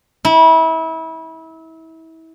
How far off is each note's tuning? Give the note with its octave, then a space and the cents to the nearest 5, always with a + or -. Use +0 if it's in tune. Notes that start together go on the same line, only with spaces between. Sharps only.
E4 -30